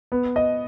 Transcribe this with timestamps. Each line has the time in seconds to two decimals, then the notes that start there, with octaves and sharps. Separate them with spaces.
0.12 B3
0.36 D#5